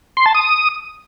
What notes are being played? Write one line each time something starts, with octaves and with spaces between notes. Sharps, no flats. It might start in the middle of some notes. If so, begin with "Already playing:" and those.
C6
A5
D#6